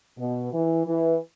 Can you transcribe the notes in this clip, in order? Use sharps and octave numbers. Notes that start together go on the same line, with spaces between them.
B2
E3
E3